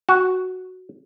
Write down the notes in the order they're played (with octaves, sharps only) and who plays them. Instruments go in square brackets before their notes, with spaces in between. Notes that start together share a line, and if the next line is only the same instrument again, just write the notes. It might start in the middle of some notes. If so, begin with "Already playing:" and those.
[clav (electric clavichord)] F#4